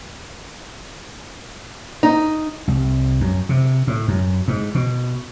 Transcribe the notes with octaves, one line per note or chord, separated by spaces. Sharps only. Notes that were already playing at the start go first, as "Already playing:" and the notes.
D#4
C2
F#2
C3
A2
F#2
G#2
B2